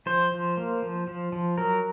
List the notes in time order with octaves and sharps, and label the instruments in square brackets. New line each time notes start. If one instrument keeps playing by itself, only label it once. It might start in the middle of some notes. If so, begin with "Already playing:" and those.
[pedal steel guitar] F3 C5
F3
A#3
F3
F3
F3
F#3 A#4